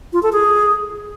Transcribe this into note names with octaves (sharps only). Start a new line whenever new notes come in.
F4
A4
G#4